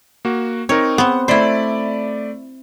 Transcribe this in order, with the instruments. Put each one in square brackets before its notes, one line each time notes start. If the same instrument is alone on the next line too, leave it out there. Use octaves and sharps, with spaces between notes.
[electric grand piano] A#3 F#4
[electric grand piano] C4 D#4 A#4 [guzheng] C#5
[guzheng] B3 C4 [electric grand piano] F#5
[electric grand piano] A3 D5 B5 [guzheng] E4 C5